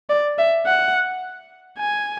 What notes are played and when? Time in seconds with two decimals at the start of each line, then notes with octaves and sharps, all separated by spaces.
0.10 D5
0.38 E5
0.66 F#5
1.79 G#5